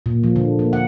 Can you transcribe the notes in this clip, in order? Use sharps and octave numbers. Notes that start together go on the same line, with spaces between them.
A#2
F3
D3
A#3
F#5